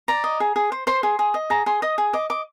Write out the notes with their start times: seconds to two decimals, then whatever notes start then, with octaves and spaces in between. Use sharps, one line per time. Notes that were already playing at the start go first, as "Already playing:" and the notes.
0.08 D5 A#5
0.24 D#5
0.40 G#4
0.56 G#4
0.72 C5
0.87 C5 C6
1.03 G#4
1.19 G#4
1.34 D#5
1.50 G#4 A#5
1.66 G#4 C6
1.82 D#5 D#6
1.98 G#4
2.13 D#5 D6
2.30 D#5 D6